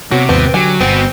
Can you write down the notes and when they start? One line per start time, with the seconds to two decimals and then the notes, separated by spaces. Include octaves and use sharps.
0.11 C3 F#3 B3 F#4
0.29 D#2 G#2 F3 B3 C4
0.54 D3 F#3 G4 G#5
0.80 G1 B3 C4 F#4